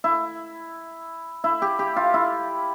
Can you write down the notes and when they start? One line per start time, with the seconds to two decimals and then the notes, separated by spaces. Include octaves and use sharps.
0.04 E4
1.44 E4
1.62 G4
1.79 G4
1.96 F4
2.14 E4